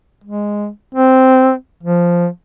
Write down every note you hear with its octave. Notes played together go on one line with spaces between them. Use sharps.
G#3
C4
F3